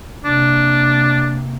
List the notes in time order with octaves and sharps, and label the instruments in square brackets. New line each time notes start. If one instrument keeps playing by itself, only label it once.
[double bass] C3 A#3 [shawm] D4